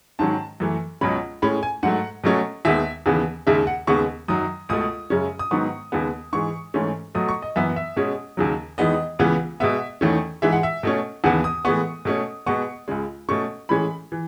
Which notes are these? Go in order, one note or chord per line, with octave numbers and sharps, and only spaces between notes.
G#2 D#3 F#3 C#4 A5
F#2 E3 A3
C#2 B2 F#3 C#4 B5
A2 G#3 C#4 B5
G#5
G#2 F#3 A3 F#5
B2 F#3 A3 C#4
D#2 D#3 G#3 B3 E5
D#2 C#3 E3 B3
D#2 C#3 G#3 E5
F#5
D#2 C#3 G#3 B3 C#6
F#2 D#3 F#3 D#6
C#2 B2 A3 D#6
F#2 C#3 G#3 C#4
D#6
G#2 D#3 F#3 B3 C#6
D#2 C#3 G#3 B3
G#2 E3 G#3 C#6
G#2 E3 A3 C#4
B2 F#3 A3 D#6
C#6
D#5
F#2 E3 B3 E5
E5
B2 G#3 C#4
D#2 C#3 F#3
E2 D#3 G#3 B3 D#5
C#2 C#3 E3 B3
B2 G#3 B3 E5
E2 D#3 A3 C#4
G#2 E3 G#3 E5
F#5
E5
B2 A3 C#4
D#2 C#3 E3 B3 F#5
D#6
A2 E3 G#3 B3 C#6
B2 A3 C#4
B2 G#3 B3 C#6
C#2 C#3 G#3
B2 A3 C#4 C#6
A2 E3 G#3 C#4 B5
E3